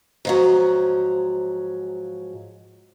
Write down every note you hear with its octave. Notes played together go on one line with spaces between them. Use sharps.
G#2 F3 F#3